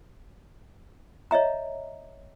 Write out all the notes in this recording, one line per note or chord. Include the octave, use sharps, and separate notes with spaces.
C#5 D#5 E5 A#5